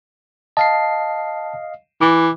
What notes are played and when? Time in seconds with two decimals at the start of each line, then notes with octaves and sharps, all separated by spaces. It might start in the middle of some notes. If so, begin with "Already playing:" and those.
0.57 D#5 F5 A5 C7
2.01 E3 D6